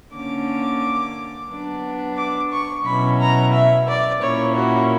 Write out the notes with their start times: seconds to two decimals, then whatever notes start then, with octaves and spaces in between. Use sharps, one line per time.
0.14 D3 A#3 C#4 D6
1.49 F#3 B3 D4
2.16 D6
2.51 C#6
2.84 B2 F#3 C#4 E4 B5
3.19 A#5
3.52 E5
3.87 D5
4.20 A#2 A#3 C#4 E4 C#5
4.54 F#4